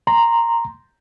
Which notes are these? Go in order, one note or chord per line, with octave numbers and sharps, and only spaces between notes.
A#5 C6